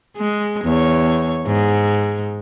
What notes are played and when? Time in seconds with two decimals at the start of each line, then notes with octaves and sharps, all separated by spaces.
0.17 G#3
0.65 E2 C#5
1.46 G#2